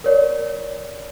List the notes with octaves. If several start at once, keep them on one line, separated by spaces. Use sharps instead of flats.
A#4 C#5 D5